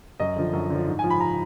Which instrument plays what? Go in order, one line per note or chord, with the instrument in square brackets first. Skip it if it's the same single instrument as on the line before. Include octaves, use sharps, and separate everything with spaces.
[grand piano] F#2 D#5
D3 F3
F#2
D3 F3
G#2
F3 G#5
B5
A#5